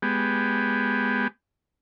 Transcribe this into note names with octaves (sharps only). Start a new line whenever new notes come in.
G#3 B3 G4